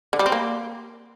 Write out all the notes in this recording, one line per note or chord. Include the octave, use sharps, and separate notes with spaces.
D3
G3
C4
A#3